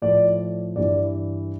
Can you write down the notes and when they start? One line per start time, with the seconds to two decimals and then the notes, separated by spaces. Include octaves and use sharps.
0.02 A2 F3 D5
0.76 G2 E3 D5